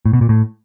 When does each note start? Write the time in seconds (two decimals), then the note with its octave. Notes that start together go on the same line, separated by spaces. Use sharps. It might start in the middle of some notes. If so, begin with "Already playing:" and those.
0.05 A2
0.13 B2
0.21 A#2
0.29 A2